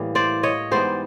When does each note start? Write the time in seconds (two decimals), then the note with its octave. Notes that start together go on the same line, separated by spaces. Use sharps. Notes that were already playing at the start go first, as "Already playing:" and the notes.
Already playing: A2 E3 G3 A#3
0.15 C5 D5
0.43 C#5 D#5
0.71 G#2 E3 G3 B3 C5 D5